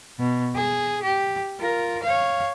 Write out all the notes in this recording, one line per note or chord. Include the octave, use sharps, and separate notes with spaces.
B2
G#4
G4
F4 A#4
C#5 F5